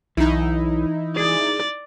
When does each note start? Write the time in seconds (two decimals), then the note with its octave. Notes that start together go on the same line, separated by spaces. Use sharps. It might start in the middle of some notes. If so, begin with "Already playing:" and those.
0.17 B1 E3 D#4 E4
1.17 G#4 D5